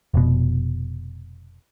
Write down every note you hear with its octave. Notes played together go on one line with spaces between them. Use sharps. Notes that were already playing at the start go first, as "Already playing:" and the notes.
F1 B2